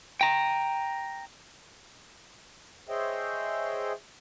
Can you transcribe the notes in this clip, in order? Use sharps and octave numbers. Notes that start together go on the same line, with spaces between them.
G5 A#5
G#4 C5 C#5 D#5 E5 G5